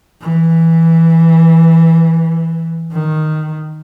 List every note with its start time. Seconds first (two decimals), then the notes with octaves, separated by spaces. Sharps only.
0.21 E3
2.92 D#3